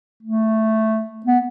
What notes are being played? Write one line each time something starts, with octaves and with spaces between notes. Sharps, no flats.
A3
B3